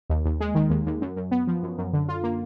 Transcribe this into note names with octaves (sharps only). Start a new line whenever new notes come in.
D#2
D#2
G#3
D#3
D#2
D#2
F#2
F#2
B3
F3
F#2
F#2
D3
F4
A#3